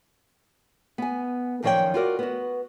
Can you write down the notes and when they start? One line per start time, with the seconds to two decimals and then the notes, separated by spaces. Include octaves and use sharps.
0.98 B3 G#5
1.63 F#2 D#3 F3 C#5 D5 G5
1.94 F4 F#4 A#4 D5
2.19 B3 F#4